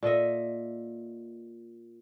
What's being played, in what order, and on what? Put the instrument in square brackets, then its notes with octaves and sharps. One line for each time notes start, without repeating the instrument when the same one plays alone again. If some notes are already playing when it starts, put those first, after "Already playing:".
[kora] A#2 A4 D#5 E5